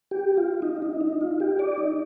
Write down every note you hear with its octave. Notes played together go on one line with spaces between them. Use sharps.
G4
F4
D#4
D#4
D#4
F4
G4
D5
D#4